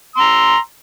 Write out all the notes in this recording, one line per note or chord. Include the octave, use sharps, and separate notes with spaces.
A#5 C6 E6